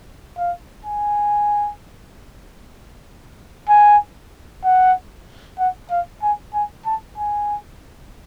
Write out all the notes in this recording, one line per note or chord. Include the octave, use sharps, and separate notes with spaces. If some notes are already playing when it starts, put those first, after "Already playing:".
F5
G#5
G#5
F#5
F#5
F5
G#5
G#5
A5
G#5